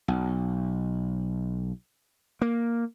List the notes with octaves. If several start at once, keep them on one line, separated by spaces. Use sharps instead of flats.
B1
A#3